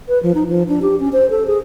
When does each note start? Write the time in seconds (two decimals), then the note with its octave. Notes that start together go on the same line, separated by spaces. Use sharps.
0.09 B4
0.23 F3
0.35 D#4
0.48 F3
0.68 D4
0.82 G4
1.00 C#4
1.13 C5
1.30 A4
1.47 G#4